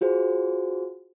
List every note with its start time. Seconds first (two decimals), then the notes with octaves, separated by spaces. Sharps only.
0.01 F4 F#4 G#4 C5